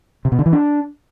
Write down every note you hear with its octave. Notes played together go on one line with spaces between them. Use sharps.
C3
B2
D3
E3
D4